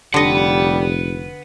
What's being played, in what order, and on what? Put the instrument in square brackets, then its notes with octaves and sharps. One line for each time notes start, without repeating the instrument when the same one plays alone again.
[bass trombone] F1 [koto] D3 D#5 [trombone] G3 [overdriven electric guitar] B4 F#5